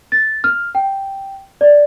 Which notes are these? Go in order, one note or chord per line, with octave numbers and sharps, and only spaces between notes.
A6
F6
G5
D5